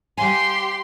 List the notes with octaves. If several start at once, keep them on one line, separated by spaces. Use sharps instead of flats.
G3 G4 F5 G#5 C6